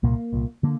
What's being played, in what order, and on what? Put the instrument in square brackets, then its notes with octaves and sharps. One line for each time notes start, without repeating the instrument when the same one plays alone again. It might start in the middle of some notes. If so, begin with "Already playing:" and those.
[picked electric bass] C2 A#2 A#3
C2 A#2
D3 A#3